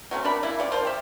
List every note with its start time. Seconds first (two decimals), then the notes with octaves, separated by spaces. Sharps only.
0.11 F#3 A3 C4 C#4
0.24 D4 A#4 D5 B5
0.43 C#3 A#3 E4
0.59 C#3 F4 D5
0.72 F3 F4 A#4 C5
0.85 G4 E5